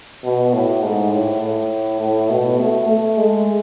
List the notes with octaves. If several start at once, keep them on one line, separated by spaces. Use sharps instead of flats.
B2
A2
G#2
A2
A2
A2
B2
A3
A3
G#3